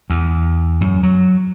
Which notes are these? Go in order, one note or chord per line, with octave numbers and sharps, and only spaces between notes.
E2
F#2
F#3